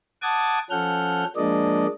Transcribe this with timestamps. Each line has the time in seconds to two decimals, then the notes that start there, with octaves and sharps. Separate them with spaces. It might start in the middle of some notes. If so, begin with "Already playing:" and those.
0.22 F#5 A5 D6 D#6 G#6
0.70 F3 C#4 A4 F#5 F6 G6
1.36 F3 G#3 A#3 D4 D5 D#5